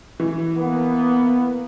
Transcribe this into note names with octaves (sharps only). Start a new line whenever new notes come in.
E3
A#3 B3